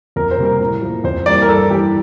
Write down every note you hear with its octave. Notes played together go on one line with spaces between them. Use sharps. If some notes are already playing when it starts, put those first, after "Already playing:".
F2 A#4
C5
C3 G3 A#3
A#4
A2
F3 A#3
F2 C5
E3 G3 A#3 D5
A#4
G2 A4
E3 G3 G4